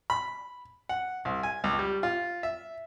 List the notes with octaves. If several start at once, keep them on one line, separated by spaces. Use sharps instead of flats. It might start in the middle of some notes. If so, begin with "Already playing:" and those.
B5
F#5
C2
G#5
C#2
G3
F4
E5